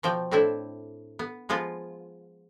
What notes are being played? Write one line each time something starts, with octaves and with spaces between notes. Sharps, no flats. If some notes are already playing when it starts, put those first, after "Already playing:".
B2 F3 D5 G5
A2 C4 D4 E4 E5
B3
F3 G#3 B3 F4